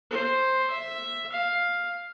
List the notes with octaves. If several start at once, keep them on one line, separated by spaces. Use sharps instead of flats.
C5
E5
F5